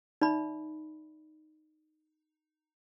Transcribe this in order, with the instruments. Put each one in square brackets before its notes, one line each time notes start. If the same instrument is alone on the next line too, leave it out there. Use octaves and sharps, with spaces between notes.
[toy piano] D#4 D5 E5 B5